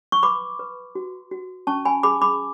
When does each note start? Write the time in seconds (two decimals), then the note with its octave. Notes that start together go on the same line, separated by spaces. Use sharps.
0.12 C#6
0.23 B4 B5 D6
0.59 B4
0.95 F#4
1.31 F#4
1.67 C#4 A5 C#6
1.85 G#5 B5
2.03 G#4 B5 D6
2.22 B5 D6